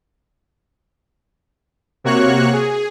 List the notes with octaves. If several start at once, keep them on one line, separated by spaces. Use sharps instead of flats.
C3 A#3 F#4 C#5 C#6 F#6
G#4